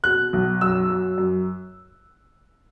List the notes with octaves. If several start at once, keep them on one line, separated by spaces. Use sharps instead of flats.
B2 F#6
B1
F#2 E6
F#3
F#2